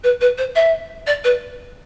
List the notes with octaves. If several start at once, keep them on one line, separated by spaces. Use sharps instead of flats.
B4
B4
C5
E5
D5
B4